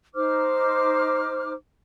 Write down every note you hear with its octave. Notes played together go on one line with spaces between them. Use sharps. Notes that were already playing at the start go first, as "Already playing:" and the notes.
D#4 C5 D6 F6